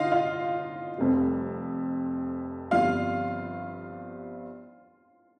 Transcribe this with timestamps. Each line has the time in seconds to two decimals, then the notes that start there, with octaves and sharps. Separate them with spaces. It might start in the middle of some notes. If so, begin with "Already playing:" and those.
Already playing: D3 D#4 F4 D#5 F5
0.12 F4 F5
0.98 F1 F2 C3 G3
2.71 G1 G2 F3 C4 F4 F5